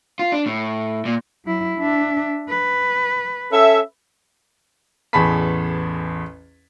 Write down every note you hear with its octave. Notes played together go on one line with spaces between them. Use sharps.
F4
D4
A2
A#2
F#3 E4
D4 E5
B4
C#4 A4 E5
A1 E2 G#4 A5 B5 B6